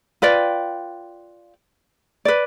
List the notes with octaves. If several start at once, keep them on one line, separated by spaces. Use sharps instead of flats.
F4 B4 D5 G5
B4 D5